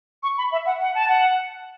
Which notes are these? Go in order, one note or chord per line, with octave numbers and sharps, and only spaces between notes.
C#6
B5
E5
F#5
F#5
A5
F#5